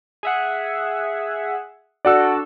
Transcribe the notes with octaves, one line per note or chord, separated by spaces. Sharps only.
G#4 E5 F#5
D4 F#4 A4 D5 F#5 E6